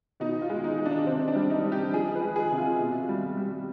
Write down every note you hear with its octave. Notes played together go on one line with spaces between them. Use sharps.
B2 D#4
F4
G#3
D#4
G#3
D4
C3 C4
D4
G3
D#4
G3
G4
F3 G#4
B4
G#3
G#4
C3
F4
B2
G3
G3